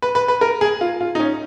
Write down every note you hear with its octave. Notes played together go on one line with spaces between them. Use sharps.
B4
B4
B4
A#4
G#4
F4
F4
D#4
C#4